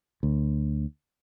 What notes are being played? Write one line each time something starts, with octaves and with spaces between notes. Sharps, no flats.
D2